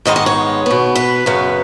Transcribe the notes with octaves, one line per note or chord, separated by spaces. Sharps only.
G#2 D#3 G#3 B3 D#5
D#5
C#5
B2 B3
B4
F#2 C#3 B3